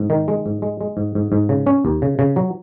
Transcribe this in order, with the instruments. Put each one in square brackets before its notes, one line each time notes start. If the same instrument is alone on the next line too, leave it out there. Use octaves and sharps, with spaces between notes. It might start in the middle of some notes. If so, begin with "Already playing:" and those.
Already playing: [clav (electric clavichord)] G#2
D#3
G#3
G#2
G#3
G#3
G#2
G#2
G#2
C#3
C#4
D#2
C#3
C#3
F#3